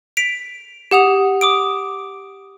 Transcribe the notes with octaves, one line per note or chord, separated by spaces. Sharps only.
B6 D7 F7
G4 F#5 D#6 F7
D6 D#6 D7